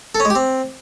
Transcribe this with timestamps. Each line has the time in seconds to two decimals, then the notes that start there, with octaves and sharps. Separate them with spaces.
0.15 A4
0.20 C#4
0.25 G#3
0.30 G4
0.35 C4